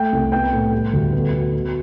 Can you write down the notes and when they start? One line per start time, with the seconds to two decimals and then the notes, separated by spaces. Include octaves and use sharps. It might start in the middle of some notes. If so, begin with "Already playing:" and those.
Already playing: A3 G5
0.12 C2
0.32 B3 G5
0.52 A2
0.73 G3
0.93 D2
1.13 B3
1.33 B2
1.53 B2